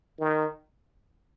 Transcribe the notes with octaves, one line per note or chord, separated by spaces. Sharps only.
D#3